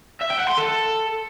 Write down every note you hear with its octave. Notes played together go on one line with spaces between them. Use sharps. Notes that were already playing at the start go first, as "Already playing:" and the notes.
E5
G5
F#5
C6
A4